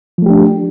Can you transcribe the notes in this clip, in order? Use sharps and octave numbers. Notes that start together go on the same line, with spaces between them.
F3 A3 D4 G4